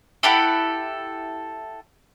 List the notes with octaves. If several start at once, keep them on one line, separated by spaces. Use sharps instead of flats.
E4 G4 A4 F#5